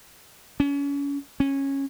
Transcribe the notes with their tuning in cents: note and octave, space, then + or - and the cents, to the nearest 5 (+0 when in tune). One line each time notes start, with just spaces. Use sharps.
C#4 +35
C#4 -15